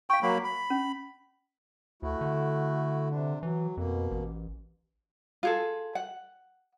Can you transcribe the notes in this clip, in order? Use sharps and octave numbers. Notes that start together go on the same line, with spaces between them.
F5 G5 C#6
F#3 A#3 B5
B5
C#4
D2 A3 E4 F#4
D3
C3 D4
E3 F#3
F2 B2 A#3
A1
F4 G#4 A4
F#5